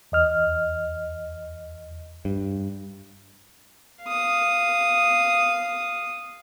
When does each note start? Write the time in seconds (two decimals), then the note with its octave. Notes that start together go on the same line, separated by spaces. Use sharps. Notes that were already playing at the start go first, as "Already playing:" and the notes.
0.12 E2 D#5 F6
2.25 G2
4.04 F5 D#6